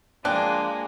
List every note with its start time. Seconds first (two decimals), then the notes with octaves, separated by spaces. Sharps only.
0.25 F3 G#3 A#3 D4 G5 F#6